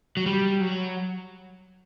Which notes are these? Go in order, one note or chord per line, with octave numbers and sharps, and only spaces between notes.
F#3
G3
F#3